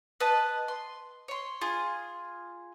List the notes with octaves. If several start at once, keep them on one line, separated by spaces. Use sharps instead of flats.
B4 D#5 A5
C6
C#5 C6
F4 G#4